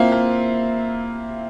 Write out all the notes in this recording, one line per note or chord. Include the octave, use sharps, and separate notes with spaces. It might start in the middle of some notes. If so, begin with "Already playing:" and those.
Already playing: A#3 C4 E4 F4
A#3